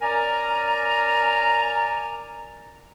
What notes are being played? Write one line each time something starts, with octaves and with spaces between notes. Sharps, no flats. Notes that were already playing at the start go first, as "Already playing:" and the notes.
C#4 A#4 D5 G#5 A#5